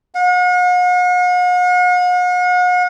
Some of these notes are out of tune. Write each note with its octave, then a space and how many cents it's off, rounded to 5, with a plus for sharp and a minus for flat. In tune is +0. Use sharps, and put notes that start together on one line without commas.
F#5 -45